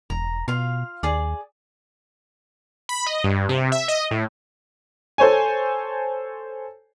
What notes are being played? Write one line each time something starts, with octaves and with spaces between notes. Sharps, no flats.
E1 A#5
B2 F4 F5
D#2 G#4 D5
B5
D#5
G2
C3
E5
D#5
A2
A4 C5 C#5 G#5